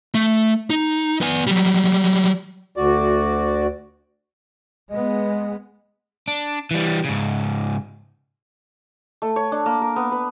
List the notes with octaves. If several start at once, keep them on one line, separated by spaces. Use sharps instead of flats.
A3
D#4
B3 G#5
F#3 G3
D2 F#4 D5
G#3 B3 D#5
D4
E3 G3
G#2 C#3
A3
C#5
D4
A#3
A#4
B3
B4